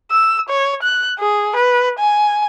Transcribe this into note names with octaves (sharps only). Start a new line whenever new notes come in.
E6
C#5
F#6
G#4
B4
G#5